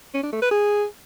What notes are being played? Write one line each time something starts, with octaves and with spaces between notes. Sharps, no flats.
C#4
D4
A3
B4
G#4